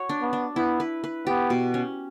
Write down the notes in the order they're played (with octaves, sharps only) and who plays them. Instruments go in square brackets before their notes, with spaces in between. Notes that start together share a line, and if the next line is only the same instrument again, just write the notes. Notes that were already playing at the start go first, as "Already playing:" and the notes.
Already playing: [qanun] F#4 C#5
D4
[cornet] B3
[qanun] D4
[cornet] B3 [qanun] E4
[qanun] B4
B4
[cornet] B3 [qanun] G4
[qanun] B2
C#4